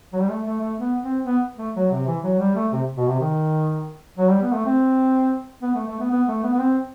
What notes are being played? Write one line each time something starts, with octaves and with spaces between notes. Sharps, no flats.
F#3
G3
A3
A3
A3
B3
C4
B3
A3
F#3
C3
E3
F#3
G3
A3
C3
B2
C3
D#3
F#3
G3
B3
A3
C4
B3
A3
A3
B3
B3
A3
B3
B3
C4